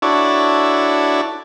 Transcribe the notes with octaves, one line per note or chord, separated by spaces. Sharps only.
D4 E4 F#4 A4 C#5 D5